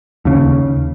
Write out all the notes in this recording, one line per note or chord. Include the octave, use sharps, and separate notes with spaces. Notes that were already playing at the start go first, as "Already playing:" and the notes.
D#2 C#3